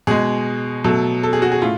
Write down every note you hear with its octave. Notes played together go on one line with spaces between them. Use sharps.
B2 G#3 G#4
B2 F#3 A3 A4
A4
G#4
F#4
G#4
A2 F4